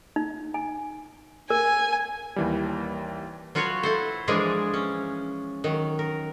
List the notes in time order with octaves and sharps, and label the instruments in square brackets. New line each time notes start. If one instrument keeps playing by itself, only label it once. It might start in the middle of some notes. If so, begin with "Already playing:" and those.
[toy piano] D#4
G#5
[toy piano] A#4 [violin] G#5
[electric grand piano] D#2 E3 G3
[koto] F#3 F4 F#4 B4 C#5
E4 A4 C5
E3 F3 G#3 D4 G#4 A#4
C#4
D#3 F#3
A#4